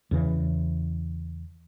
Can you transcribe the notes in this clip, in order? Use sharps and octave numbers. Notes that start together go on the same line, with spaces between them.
E2 C#3 E3